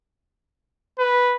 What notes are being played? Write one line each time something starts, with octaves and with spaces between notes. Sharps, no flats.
B4